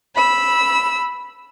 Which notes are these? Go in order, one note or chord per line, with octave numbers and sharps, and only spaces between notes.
B5 E6